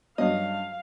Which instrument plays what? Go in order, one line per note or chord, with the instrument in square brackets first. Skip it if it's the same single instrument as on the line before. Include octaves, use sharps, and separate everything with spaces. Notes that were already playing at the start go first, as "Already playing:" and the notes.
[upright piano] G2 C#4 [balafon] F#3 F#4 [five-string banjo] D#5 [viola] F5